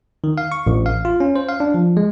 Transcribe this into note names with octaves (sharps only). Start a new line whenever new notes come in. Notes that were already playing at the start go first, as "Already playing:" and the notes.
D#3
F5
C#6
A1
F5
F4
C#4
C5
F5
D4
F3
G#3